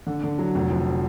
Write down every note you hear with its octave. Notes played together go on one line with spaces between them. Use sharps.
D3
D3
F#3
F1
F3